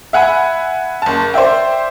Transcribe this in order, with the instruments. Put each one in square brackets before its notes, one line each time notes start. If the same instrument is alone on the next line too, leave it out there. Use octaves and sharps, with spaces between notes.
[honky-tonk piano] E5 F#5 G#5 B5
F#1 A5
C5 D5 E5 G5